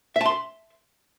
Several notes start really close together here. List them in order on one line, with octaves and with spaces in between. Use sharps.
E5 A5 C6